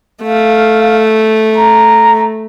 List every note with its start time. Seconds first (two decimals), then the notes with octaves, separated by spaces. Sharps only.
0.23 A3 F5
1.57 A#5